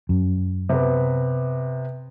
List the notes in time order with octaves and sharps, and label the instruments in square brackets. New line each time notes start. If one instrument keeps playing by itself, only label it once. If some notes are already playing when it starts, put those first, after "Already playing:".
[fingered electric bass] F#2
[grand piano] C3 B3